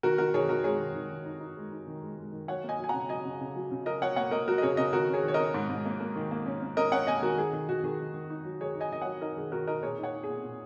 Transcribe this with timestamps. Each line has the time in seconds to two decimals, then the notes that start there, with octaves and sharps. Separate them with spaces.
0.03 D#3 F#4 A#4
0.18 D#3 F#4 A#4
0.34 D#3 G#4 C#5
0.49 D#3 F#4 A#4
0.64 G#3 G#4 C#5
0.79 D#3
0.95 D#3
1.10 D#3
1.26 D#4
1.41 D#4
1.57 G#3
1.72 D#4
1.88 D#3
2.03 G#3
2.18 G#3
2.33 D#3
2.48 F#3 C#5 F#5
2.64 A#3
2.69 D#5 G#5
2.79 F#3 G#5
2.89 C#3 F#5 A#5
3.09 F#3 D#5 G#5
3.25 C#3
3.41 C#3
3.56 F#3
3.71 C#3
3.86 F#3 A#4 D#5
4.02 F#3 C#5 F#5
4.16 A#3 C#5 F#5
4.31 A#3 A#4 D#5
4.48 F#3 F#4 A#4
4.58 D#5
4.62 C#3 G#4 C#5
4.77 C#3 A#4 D#5
4.93 D#3 F#4 A#4
5.09 C#4 G#4 C#5
5.23 D#3 C#5
5.34 A#4 D#5
5.40 C#4
5.54 G#2
5.70 G#2
5.86 A#3
6.00 A#3
6.16 D#3
6.31 A#3
6.46 C#4
6.62 C#4
6.76 C#4 A#4 D#5
6.92 C#4 C#5 F#5
7.07 A#3 D#5 G#5
7.22 D#3 F#4 A#4
7.38 D#3 G#4
7.53 D#3 G#4
7.69 D#3 F#4
7.84 D#3 G#4
8.00 D#3
8.14 D#3
8.30 D#4
8.45 F#3
8.60 D#3 G#4 C#5
8.75 D#4
8.81 D#5 G#5
8.92 D#3 D#5
9.01 F#3 C#5 F#5
9.21 D#4 A#4 D#5
9.37 D#3 G#4
9.52 D#3 F#4 A#4
9.67 D#4 A#4 D#5
9.83 A#2 G#4 C#5
9.99 D#4 C#5 F#5
10.13 D#4
10.24 G#4
10.29 A#2
10.43 A#2